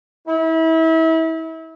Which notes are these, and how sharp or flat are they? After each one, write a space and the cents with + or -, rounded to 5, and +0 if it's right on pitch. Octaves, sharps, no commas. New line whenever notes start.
E4 -30